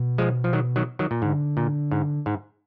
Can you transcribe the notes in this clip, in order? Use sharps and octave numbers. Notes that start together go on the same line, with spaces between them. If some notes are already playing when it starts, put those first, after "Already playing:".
Already playing: B2
F3 G#3
F3
D#3 F#3
D#3 F#3
D#3 F#3
A#2
G#2 D3
A#2
G#2
G#2